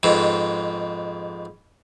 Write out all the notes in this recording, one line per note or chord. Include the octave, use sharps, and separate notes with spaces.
F2 G#2 B2